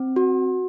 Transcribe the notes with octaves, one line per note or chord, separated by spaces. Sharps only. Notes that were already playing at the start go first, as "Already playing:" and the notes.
Already playing: C4
F#4